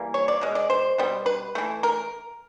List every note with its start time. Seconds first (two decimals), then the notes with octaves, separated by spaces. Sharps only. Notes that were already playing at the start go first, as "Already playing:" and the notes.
Already playing: E3 G3 A#3
0.14 C#5
0.28 D5
0.41 B2 G#3
0.55 D5
0.70 C5
0.98 B2 G3 B3
1.26 B4
1.55 E3 A3
1.83 A#4